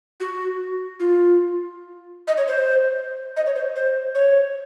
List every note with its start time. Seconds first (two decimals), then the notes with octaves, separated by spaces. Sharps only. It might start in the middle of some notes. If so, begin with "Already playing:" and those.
0.20 F#4
1.00 F4
2.28 D#5
2.37 C#5
2.48 C5
3.37 D#5
3.46 C#5
3.55 C5
3.76 C5
4.15 C#5